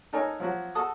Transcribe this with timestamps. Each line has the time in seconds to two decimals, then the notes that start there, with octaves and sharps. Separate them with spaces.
0.13 D#4 A4 A#4 C#5 D#5 G#5
0.40 F3 F#3 F#4
0.75 F#4 A4 F#5 D#6